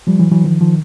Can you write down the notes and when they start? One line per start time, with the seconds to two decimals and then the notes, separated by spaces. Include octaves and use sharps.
0.07 F3 G3
0.19 E3 F#3
0.31 E3 F#3
0.44 D#3 F3
0.61 D#3 F3